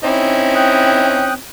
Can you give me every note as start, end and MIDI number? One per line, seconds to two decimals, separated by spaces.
0.04 1.38 60
0.04 1.35 61
0.04 1.35 63
0.04 1.35 64
0.55 1.33 79
0.55 1.33 87
0.55 1.33 90